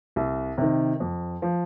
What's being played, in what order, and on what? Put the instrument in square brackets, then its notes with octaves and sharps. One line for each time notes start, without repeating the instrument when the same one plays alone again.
[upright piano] C2
C3 D#3
F2
F3